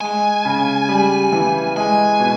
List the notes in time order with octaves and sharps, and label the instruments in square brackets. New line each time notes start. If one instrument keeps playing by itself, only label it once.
[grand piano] G#3 [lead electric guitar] G#5
[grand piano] C#3
G3
E3
[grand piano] G#3 [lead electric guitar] G#5
[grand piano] B2